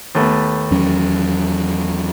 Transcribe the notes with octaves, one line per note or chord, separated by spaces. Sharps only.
D#2 A3 B3
E2 F#3 C#4